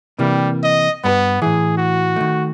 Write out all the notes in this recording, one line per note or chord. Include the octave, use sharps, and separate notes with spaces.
C3 E3 G3 A#3
D#5
G2 B3 A4 B4
A2 E3 G#4
F#4
D#3 A3